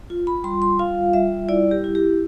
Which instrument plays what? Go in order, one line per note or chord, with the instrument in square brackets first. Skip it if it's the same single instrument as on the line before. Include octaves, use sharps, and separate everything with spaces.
[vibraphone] F4
B5
G3 C6
C6
F4 F5
G3 E5
E4 D5
G4
E4
G4